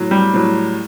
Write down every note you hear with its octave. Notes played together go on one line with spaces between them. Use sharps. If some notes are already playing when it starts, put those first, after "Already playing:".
Already playing: A2 F#3
G3
A2 F#3